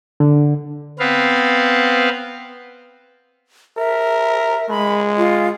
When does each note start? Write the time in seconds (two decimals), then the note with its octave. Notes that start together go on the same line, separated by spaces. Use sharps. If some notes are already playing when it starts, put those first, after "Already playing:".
0.20 D3
0.99 B3 C4 B4 F5
3.77 A#4 E5
4.70 G#3 B5
5.17 F4